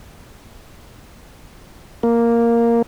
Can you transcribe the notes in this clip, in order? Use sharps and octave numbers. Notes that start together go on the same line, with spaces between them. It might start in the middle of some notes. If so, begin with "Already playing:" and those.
A#3